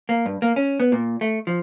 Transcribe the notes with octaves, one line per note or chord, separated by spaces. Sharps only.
A#3
G2
A#3
C#4
B3
A#2
A3
F3